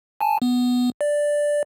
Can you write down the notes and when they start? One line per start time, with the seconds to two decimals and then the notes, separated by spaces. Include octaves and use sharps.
0.21 G#5 A5
0.42 B3
1.01 D5